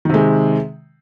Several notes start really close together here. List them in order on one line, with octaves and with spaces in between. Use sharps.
D#3 C3 G#3